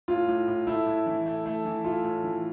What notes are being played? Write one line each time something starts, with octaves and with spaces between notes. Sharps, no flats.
A2 F4
A2
A2
A3 E4
A2
E3
A3
A3
E3
A3 F4
A2
E3